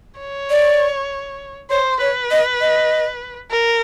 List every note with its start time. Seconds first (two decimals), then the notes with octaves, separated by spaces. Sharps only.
0.20 C#5
0.50 D5
1.70 C5 C#5
2.01 B4 C#5
2.31 D#5
2.61 D#5
3.51 A#4